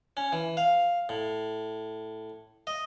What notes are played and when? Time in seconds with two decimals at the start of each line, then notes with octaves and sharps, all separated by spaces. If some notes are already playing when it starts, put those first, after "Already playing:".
0.17 C#4
0.32 E3
0.57 F5
1.09 A2
2.67 D#5